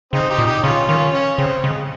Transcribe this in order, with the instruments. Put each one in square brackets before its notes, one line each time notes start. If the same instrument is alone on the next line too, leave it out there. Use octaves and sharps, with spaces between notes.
[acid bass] C#3 [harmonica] C4 D#4
[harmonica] D#4 G4
[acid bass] A#2
[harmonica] D#4 G4
[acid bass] C#3 [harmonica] C#4 F4
[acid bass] D#3 [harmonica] C#4 F4
[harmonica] C#4
[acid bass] C#3 [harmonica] C4
[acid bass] C#3 [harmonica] G#3